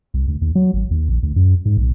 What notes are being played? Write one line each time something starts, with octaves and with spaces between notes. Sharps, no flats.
C2
D2
D#2
F#3
G#1
D#2
A#1
D2
F#2
G#2
B1